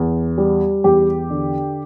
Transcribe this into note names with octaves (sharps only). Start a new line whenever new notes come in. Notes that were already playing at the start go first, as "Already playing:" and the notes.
Already playing: E2
G3
E2 G4
D3